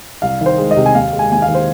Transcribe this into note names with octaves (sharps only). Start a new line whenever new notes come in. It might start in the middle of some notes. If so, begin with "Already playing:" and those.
C2 F5
D#3
C5
G#3
D#5
C3
G#5
D#2 F5
G#3
G#5
D#2 G#5
F5
D#3
C5